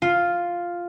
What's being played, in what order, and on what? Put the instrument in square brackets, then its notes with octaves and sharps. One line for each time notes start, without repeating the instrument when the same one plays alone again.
[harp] F4